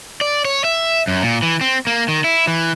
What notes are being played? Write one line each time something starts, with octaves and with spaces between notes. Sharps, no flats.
D5
C#5
E5
F#2
A#2
E3
C4
A#3
D#3
E4
E3